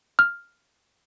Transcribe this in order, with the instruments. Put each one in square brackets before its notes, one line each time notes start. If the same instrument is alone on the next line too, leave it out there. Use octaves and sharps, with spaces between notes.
[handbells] F6